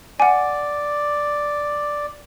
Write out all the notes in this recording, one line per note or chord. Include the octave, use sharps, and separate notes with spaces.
D5 F#5 G#5